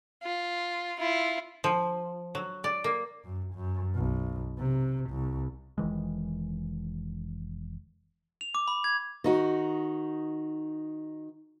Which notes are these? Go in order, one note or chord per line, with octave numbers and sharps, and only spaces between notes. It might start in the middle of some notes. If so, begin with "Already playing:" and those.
F4
E4 F4
F3
F#3
D5
A#3
F#2
F#2
B1
C3
C2
F1 D#3 E3 G#3
F7
D6
B5
G#6
D#3 D#4 F#4